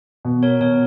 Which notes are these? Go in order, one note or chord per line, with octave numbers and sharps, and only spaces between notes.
B2
A#4 C#5
B2 A#4 C#5